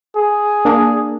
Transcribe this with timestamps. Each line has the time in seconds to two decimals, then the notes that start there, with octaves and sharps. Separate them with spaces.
0.16 G#4
0.65 A#3 D4